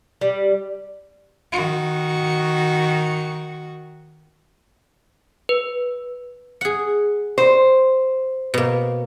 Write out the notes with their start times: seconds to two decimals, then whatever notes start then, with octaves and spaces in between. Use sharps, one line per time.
0.21 G3
1.52 D#3 F#4
5.49 B4
6.61 G#4 F#5
7.38 C5
8.54 B2 A#3